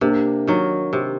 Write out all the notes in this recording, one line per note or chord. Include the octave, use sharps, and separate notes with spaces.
C3 A#3 D4
D#3 F#3
C3